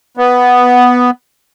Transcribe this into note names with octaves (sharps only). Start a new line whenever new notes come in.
B3